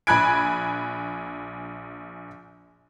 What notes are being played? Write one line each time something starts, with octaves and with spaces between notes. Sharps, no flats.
A#1 G#5 B5 F#6 G#6 D7